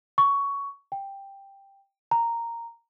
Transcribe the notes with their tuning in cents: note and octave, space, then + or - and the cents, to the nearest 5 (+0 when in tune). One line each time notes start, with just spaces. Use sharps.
C#6 +15
G5 +5
A#5 -5